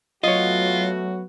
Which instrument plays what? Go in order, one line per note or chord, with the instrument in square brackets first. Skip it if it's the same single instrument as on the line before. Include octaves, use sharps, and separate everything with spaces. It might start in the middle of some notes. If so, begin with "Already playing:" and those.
[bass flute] F#3 [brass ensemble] A3 B3 F#4 [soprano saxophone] F4 [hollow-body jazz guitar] C#5 D#5